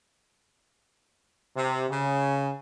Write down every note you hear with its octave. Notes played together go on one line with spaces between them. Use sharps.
C3
C#3